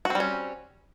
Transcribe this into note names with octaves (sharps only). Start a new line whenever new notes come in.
G3 C4 C#4 F#4